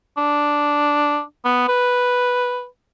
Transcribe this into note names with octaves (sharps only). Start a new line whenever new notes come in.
D4
B3
B4